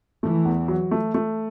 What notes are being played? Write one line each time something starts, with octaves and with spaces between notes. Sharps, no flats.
E3 A3
E2
F#3
A3
A3